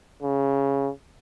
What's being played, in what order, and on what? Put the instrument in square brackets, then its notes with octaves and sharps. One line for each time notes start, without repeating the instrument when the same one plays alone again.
[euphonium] C#3